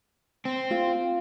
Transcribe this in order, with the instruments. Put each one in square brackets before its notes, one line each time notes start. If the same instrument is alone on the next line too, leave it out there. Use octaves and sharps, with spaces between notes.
[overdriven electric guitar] C4
[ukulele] F4